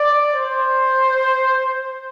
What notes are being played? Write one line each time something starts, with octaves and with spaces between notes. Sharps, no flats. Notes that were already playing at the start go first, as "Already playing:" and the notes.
Already playing: D5
C5